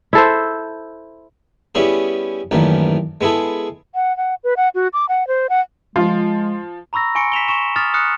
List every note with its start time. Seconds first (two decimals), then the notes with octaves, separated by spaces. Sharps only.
0.13 E4 A4 C5
1.75 G3 B3 C#4 E4 G#4
2.51 A1 F#2 A#2 D#3 E3
3.21 G#3 B3 E4 G#4 A4
3.95 F#5
4.17 F#5
4.44 B4
4.57 F#5
4.75 F#4
4.93 D6
5.09 F#5
5.28 C5
5.49 F#5
5.96 F3 G#3 F4
6.93 A#5 B5 C#6 E6 A#6
7.15 G#5 C6 C#6 C#7 D7
7.32 B6 E7 F7 G7
7.48 C#6 E7
7.76 D6 D#6 F6 A6 F7
7.94 D#6 F6 F#6 C#7